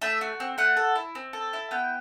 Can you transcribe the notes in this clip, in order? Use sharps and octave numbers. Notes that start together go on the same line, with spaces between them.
A3 E5
F#4
C4
A3 F#5
A4
E4
C4
A4
E4
B3 G5